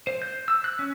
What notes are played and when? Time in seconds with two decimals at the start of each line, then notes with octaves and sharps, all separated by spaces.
0.07 C5
0.22 G6
0.48 E6
0.64 F#6
0.79 C#4